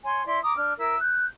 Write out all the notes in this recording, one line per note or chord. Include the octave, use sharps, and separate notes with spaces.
C#5 G#5 C6
E4 D5 C6
A#5 D6 D#6
D4 F6
E4 A#4 E6
F#6 G6